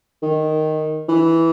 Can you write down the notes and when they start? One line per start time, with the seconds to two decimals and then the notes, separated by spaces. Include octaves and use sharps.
0.22 D#3
1.09 E3